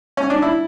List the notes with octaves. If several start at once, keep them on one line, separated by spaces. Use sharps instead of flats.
C#4
D4
E4